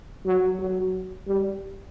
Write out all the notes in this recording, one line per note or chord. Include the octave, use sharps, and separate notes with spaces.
F#3
F#3
G3